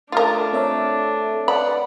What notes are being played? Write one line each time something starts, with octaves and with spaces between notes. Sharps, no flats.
A3 D4 F4 A#4 A#5 F6 A6
C4 C#5 E5
B4 D5 F#5 B5